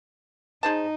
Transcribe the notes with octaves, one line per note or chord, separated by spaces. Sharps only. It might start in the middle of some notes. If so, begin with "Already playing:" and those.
D#4 G#4 C5 A5